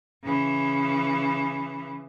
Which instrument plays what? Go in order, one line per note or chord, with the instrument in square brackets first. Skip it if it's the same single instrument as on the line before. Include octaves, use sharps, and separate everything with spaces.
[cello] C#3 E3